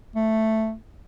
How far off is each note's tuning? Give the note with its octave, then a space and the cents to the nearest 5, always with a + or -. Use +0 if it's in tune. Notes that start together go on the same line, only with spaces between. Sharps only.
A3 +5